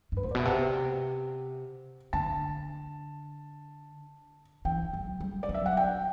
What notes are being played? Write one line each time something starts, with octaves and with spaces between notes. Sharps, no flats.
G2 B4
A2 C5
D5
B2 E5
C3 F#5
D3 A5
E3 G5
F#3
G3
D5
F#3
E5
F#5
G5